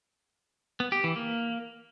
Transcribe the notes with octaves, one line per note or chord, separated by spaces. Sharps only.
B3
G4
E3
A#3